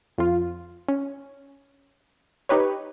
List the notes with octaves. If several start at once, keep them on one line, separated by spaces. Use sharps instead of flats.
F2 F3 F4
C#4
D#4 G4 B4 C#5